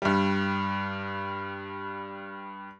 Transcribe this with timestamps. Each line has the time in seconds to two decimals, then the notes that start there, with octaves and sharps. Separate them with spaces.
0.02 G2 G3